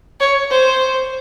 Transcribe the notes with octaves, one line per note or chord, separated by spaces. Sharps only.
C#5
C5